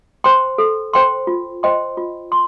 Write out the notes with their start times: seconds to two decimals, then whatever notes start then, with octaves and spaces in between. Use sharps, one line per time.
0.24 C5 G5 C6
0.58 A4
0.93 C5 G5 C6
1.27 F4
1.63 C5 D#5 G5 C6
1.97 F4
2.32 C6